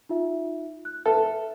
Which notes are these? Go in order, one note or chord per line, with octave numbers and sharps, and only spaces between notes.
D#4 F4 E5
F#6
A4 B4 E5 A5